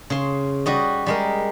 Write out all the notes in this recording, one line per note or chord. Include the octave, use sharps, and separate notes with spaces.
C#3 C6
G3 F#4 D#5
G3 G#3 A#4